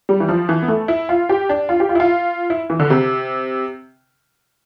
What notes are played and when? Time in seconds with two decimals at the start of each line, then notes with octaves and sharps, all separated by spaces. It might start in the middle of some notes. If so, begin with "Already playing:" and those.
0.09 G3
0.20 E3
0.29 F3
0.49 E3
0.62 B3
0.68 A3
0.88 E4
1.09 F4
1.29 G4
1.49 D4
1.69 F4
1.80 G4
1.89 F4
1.95 E4
2.00 F4
2.50 E4
2.70 E3
2.79 D3
2.90 C3